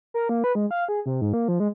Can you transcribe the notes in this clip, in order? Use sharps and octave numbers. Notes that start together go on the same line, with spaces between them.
A#4
A#3
B4
G#3
F5
G#4
C3
G#2
A#3
F3
G#3